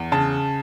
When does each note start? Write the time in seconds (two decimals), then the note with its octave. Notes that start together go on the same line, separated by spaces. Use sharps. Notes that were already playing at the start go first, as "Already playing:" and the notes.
Already playing: E2
0.12 C#3 A5